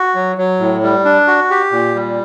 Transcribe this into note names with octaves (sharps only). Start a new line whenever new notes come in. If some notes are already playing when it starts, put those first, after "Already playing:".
Already playing: F#4
F#3
F#3
A2
G3
D4
F#4
G4
A#2
G3